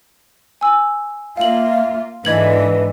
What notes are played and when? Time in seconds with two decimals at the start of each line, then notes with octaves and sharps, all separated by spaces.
0.61 G#5 E6
1.37 A#3 F4 E5 F5 F#7
2.25 G#2 D3 E3 B4 D#5 G#6 F#7